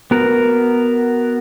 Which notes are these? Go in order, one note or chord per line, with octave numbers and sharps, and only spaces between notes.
B3 F#4 A#4